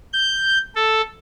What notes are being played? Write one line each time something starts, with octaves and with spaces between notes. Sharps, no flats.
G6
A4